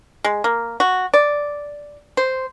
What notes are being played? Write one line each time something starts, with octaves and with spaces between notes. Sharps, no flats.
G#3
A#3
F#4
D5
C5